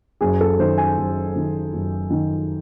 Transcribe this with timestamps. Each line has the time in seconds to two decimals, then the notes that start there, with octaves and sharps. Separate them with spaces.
0.21 F#1 G#4
0.41 A4
0.59 D#3 C5
0.77 G#5
0.97 F#1
1.36 D#3
1.73 F#1
2.10 D#3